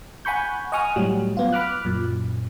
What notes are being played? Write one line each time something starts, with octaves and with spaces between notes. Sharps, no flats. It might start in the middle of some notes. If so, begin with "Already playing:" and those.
F#5 G#5 B5 C#6 G6
D#5 F#5 G#5 C#6 D#6 F6
A2 F#3 G3
B3 F4
B5 D6 F6 F#6
F#2 A#2